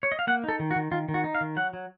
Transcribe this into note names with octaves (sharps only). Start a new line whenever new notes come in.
C#5
D#5
F5
A#3 F#5
D#4 A4
D#3
F#4
D#3
D#3 F4
D#3
F#4
D#4
F5
D#3
F#3 F#5
F#3